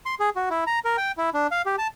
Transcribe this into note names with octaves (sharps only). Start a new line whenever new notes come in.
C6
G#4
F#4
E4
A#5
A#4
G5
E4
D4
F5
G4
A5